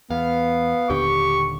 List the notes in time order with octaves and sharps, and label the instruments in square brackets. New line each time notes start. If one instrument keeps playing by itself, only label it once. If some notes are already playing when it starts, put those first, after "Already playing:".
[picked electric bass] E2 [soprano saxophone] B3 [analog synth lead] F5
[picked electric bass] D#1 D#2 D3 [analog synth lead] G4 [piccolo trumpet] C#6